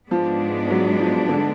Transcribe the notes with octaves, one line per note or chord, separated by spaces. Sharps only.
G#2 F3 G#3 B3 D4
F#3
F3
D3